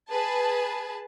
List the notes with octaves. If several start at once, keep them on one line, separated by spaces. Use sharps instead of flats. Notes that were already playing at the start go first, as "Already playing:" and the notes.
G#4 B4 A5